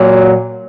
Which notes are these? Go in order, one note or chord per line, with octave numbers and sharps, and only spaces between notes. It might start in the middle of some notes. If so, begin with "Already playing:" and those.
Already playing: A#2 F#3